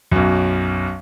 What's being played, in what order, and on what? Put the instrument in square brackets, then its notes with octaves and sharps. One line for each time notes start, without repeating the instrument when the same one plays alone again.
[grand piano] B1 F#2